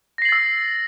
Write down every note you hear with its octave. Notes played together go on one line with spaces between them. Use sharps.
E6 A6 A#6 C7 F#7